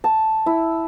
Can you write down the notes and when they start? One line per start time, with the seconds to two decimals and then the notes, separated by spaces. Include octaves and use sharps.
0.04 A5
0.46 E4